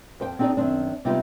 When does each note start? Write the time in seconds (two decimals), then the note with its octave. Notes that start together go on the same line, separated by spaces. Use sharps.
0.20 F2 C5 G5
0.39 C4 D4 D#4 G#4 D5 G5
0.57 F#2 D#3 C4 D4
1.05 C3 G3 G#3 B3 D#4 F4